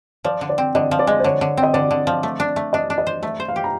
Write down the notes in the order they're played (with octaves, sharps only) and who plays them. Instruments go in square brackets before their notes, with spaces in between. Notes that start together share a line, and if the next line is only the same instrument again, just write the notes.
[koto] F3 [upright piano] D5
[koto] D3
[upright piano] D5
[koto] C4
[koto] D3 [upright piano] D#5
[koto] F3
[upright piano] D5
[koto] G#3
[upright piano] C5
[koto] D3 [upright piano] C#5
[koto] D3
C4
[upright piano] D#5
[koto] D3 [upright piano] D5
[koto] D3
F3
A3
D4
A3
[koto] D4 [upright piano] D#5
[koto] D4
[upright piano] D#5
[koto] C5
[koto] A3 [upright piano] E5
[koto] C5
[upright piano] F5
[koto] G4
[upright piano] A#5